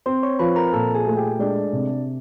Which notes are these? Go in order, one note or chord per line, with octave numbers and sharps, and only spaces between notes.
C4 C5 C6
C#5 C#6
F3 B4 B5
A#4 A#5
A#2 A4 A5
G#4 G#5
A3
G4 G5
G#3 D4 D5
C3